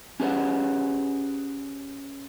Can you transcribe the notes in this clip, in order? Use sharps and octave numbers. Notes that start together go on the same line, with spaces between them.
C#4 G4 G#4 B4 C#5 F#5